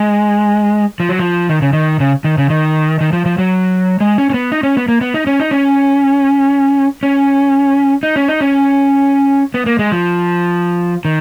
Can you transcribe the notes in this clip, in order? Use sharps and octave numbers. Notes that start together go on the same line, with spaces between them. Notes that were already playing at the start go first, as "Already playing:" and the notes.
Already playing: G#3
F3
F#3
F3
D#3
C#3
D#3
C#3
D#3
C#3
D#3
D#3
F3
F3
F#3
G#3
C#4
C#4
B3
D#4
C#4
B3
A#3
B3
D#4
C#4
D#4
C#4
C#4
D#4
C#4
D#4
C#4
B3
A#3
G#3
F3
D#3